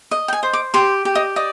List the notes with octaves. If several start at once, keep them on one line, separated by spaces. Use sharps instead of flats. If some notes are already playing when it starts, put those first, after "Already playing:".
D#5
G5
G#5
C5
D6
G4 C6
G4
D#5
D5 D#5